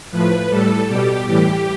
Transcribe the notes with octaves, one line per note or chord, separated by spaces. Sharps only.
A2 F3 B4
A2 G3 A4
B2 G3 G4
A2 E3 G3 G4